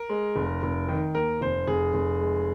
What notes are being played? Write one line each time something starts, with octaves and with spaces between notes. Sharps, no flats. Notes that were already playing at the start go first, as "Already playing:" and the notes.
Already playing: A#4
G#3
F1
F1
D#3
D#2 A#4
F1 C5
F1 G#4
F1
G#3